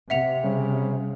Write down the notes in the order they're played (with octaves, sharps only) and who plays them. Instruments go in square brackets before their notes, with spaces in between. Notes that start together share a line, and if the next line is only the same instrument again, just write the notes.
[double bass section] C3 [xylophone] E5 F#5 F7
[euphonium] C#3 [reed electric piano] G3